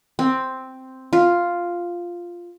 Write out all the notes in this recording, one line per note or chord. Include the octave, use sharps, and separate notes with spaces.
C4
F4